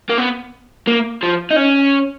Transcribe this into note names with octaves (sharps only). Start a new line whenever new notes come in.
A#3
B3
A#3
F3
D#4
C#4